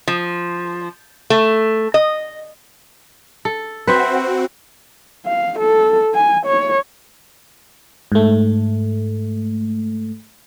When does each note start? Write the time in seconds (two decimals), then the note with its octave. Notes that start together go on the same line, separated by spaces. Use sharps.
0.08 F3
1.30 A3
1.94 D#5
3.45 A4
3.87 C4 F#4 B4 C5 E5
5.26 F5
5.59 A4
6.14 G#5
6.46 C#5
8.12 G#2 A3